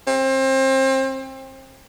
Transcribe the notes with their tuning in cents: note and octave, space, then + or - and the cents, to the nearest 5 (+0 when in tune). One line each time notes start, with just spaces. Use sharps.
C4 +30